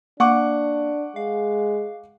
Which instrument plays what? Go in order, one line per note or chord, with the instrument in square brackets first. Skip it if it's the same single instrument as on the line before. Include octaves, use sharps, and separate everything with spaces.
[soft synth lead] A#3 [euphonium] D4 [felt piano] F#5 C#6 D6
[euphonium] G#3 [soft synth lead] F5